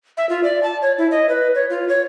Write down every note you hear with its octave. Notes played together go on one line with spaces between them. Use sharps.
E5
F4
D5
A5
C#5
E4
D#5
B4
C#5
F4
C#5